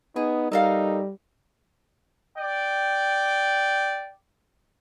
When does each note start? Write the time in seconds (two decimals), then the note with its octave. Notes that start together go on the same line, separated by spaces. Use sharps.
0.16 B3 D#4 G#4
0.52 G3 D#4 A4 A#4 F5
2.38 D5 G5